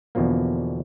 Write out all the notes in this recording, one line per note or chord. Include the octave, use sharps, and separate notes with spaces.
E2 B2 D3 F3 A#3